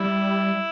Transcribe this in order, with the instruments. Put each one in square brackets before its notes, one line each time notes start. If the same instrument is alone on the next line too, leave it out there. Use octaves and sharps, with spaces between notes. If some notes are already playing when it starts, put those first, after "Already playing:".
Already playing: [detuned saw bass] G3 [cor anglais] E4